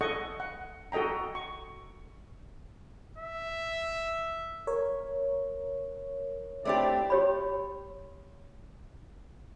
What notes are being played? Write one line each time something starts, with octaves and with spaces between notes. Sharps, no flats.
A4 D#5 F#5 C#6
F#5
F#4 A4 D#5 G5 A#5
C#6
E5
A#4 C#5
A3 C4 D4 E4 G4 D5
G4 C#5 B5